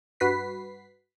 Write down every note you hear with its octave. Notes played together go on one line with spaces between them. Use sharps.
G2 F#4 B4 B6 C7